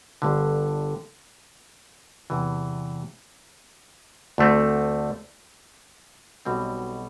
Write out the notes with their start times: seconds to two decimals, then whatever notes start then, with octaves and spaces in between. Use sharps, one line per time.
0.22 G1 G2 D3
2.30 E2 C3 E3
4.38 D2 D3 A3 C4
6.45 B1 B2 G3 C4